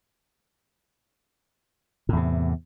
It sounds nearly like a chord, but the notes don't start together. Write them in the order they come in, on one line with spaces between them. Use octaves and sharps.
A2 E2 C3